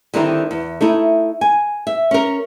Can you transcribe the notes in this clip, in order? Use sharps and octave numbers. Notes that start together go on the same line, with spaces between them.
D3 D#3 G3 C4 D#4 E4
E2
A3 D#4 E4
G#5
E5
C#4 A#4